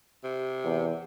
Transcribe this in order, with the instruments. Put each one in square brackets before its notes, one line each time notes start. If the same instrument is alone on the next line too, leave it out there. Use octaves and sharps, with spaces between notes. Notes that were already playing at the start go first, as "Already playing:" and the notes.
[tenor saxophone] C3
[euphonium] E2